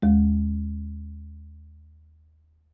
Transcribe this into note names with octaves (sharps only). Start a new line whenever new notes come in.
D#2 G#3